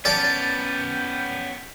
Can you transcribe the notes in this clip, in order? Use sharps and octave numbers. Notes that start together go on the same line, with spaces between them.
B3 C#4 D5 G5 A5